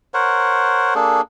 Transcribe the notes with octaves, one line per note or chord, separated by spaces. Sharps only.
A#4 C5 C#5 F#5
A#3 D4 G#4 A4